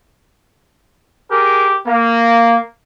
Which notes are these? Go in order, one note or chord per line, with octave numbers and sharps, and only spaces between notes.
G4 G#4 A#4
A#3 A#5